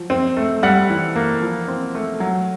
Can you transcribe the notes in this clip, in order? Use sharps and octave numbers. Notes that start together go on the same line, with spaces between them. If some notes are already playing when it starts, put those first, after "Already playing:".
Already playing: F3 F#3
C4
A3
G3 F#5 F#6
E3
A#3
F3
C4
A3
F#3